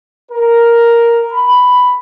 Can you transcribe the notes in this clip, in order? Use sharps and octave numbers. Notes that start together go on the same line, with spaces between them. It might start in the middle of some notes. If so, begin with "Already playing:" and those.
A#4
B5